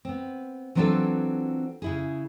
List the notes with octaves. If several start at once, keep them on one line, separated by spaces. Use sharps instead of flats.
B3 C4
E3 F#3 C4 D4 F4 A4
C#3 E4 G#4